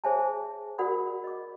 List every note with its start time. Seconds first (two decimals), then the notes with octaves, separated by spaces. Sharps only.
0.04 G#4 C5 C#5 E5 G#5 A5
0.78 F#4 A#4 D5 F#5 B5 D#6
1.24 D#5 D6